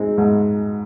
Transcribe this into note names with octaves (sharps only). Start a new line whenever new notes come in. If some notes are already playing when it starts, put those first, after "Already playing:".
Already playing: G#3 C4 D#4
G#2